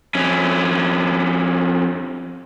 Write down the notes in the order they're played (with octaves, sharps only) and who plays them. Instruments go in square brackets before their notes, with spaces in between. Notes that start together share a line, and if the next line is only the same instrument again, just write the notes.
[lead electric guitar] F2 C#4